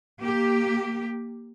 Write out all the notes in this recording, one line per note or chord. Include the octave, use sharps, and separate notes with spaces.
A#3 G4